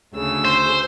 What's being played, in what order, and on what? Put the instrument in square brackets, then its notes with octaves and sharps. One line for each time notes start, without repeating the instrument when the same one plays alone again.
[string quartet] D2 C#3 E6
[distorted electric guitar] C5